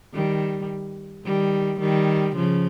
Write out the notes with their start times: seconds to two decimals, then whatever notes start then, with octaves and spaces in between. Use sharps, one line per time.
0.13 D#3 G3
1.25 D#3 G3
1.80 D#3 G3
2.36 C#3 F3